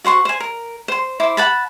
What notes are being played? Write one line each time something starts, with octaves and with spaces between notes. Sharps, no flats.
F#4 C5 C6 C#6
C5 G#5
A#4
C5 C6
E4 C5 D6
F#5 A5 B5